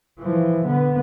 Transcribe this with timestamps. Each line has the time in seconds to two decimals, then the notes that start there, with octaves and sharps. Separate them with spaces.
0.19 E3 F3
0.66 D3 B3